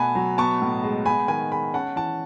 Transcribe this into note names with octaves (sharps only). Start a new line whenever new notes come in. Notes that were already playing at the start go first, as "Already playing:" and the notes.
Already playing: B2 A3 F#5 G#5 A5 B5
F#3
B3 A5 C#6
A2
G#3
B3 G#5 B5
D#3 G#5 B5
G#3 G#5 B5
C#4 F#5 A5
E3 F#5 A5